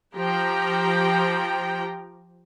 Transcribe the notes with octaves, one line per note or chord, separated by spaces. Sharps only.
F3 G4 G5 A#5